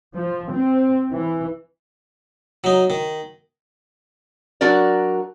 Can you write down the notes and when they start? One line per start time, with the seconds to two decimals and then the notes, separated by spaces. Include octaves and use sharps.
0.15 F3
0.52 C4
1.13 E3
2.64 F#3 D#4
2.90 D#3
4.61 F#3 D4 F#4 A#4 D5